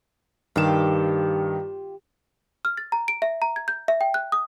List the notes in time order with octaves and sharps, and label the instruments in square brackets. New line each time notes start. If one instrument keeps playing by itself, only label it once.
[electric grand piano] G2 D#3 E7 [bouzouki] F4 G4
[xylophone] F6
A6
A#5
D7
E5
A#5
G#6
G6
E5
G5
F#6
D#6